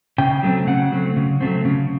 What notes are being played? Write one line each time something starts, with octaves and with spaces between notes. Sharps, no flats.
C#3 G5
F#3 A3 C4
C#3 F#5
F#3 A3 C4
C#3
F#3 A3 C4
C#3